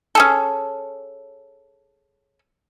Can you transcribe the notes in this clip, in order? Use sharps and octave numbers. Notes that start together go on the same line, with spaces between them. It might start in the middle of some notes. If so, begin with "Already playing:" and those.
C#4 G#4 A4